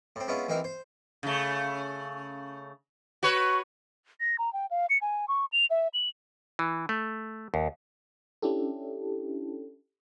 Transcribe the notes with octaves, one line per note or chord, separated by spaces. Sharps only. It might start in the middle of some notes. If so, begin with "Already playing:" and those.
A2 C4
G#3 B3 C#4 E4 F4
A1 E3 C4 D#4 A#4
C5
C#3 A3
F#4 B4 C#5
A#6
A#5
G5
F5
C#7
G#5
C#6
F7
E5
F#7
E3
A3
D#2
C#4 D4 E4 G4 A4